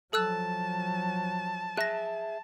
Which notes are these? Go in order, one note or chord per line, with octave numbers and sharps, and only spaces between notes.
F3 F#3 A4 A5 E6 F#6
G#4 E5 F#6 A#6